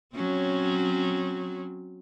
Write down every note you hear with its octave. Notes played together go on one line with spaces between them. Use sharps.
F#3 C4 C#4